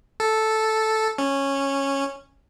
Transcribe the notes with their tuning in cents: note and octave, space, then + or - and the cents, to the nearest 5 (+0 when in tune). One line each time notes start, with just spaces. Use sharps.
A4 -5
C#4 -10